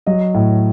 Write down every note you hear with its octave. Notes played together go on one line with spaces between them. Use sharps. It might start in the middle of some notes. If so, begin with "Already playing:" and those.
F#3 D#5
A2